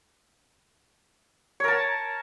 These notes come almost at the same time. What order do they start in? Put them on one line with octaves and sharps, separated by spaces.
C#5 A#4 A5